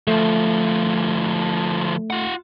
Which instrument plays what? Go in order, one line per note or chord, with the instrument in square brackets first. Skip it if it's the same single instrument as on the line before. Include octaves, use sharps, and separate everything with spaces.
[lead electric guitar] D2 F3 [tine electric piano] A3
[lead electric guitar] F4 F#5